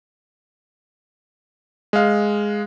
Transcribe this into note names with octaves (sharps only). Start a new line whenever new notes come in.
G#3 F5